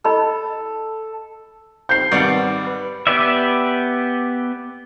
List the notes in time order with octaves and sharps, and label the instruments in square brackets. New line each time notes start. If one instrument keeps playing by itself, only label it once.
[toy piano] E4 D#5 B5 [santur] A4
[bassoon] C4 [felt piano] G6 C7
[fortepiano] G#1 G3 [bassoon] B3 [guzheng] D5 F5 F#5
[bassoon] B4
[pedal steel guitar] B3 G4 B4 D5 E5